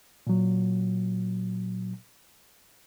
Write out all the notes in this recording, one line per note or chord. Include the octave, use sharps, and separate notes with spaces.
A#2 F#3